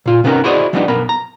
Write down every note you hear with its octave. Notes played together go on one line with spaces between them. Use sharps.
A#2 F4
C3 B3 C#4 D#4 A#4
E4 F#4 G#4 C5 D5 D#5
F3 G3 A3 B3 D4 D#4
B1 B3 A#4 B5
A#5